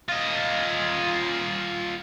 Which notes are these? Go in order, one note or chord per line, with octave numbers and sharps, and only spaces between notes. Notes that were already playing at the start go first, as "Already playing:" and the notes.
F4 D#5